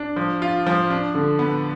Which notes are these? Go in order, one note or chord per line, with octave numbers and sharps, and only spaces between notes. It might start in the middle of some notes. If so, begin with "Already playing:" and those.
Already playing: D4
F3
F4
F3
D4
D3
B3